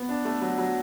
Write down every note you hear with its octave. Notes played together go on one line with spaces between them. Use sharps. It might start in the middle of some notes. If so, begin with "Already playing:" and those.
Already playing: B3
D4
A3
F#3
F#3